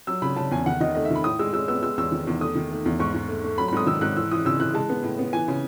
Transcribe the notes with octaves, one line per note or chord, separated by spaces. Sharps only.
F#3 E6
C#3 B5
C#3 A5
E2 G#5
D#3 F#5
D#3 D#5
A3 D#5
E5
D#3 B5
A2 D#6
G#3 E6
G#3 E6
B3 E6
G#3 E6
E2 E6
D#3
E2
A3 D#6
D#3
A3
E2
G#2 C#6
G#2
A3
A3
F#3 B5
B5
G#2 D#6
D#3 E6
G#2 F#6
E3 E6
E3 D#6
C#3 E6
E3 F#6
G#3 A5
B3
A2
B3
E3 G#5
C#3